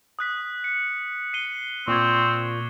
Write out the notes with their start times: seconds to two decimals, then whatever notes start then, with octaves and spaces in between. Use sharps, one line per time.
0.19 D#6 F#6 B6
0.64 C#7
1.33 C7 D#7 G7
1.88 A#2 C4 C#6 D6 G#6